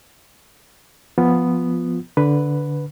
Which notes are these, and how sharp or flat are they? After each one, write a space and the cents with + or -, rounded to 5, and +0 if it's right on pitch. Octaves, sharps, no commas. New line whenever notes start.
F3 +0 B3 +0 F4 +0
D3 -10 B4 +0